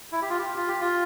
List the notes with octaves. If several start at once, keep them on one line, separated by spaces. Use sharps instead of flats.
E4
G4
F4
G4
F4
G4
F4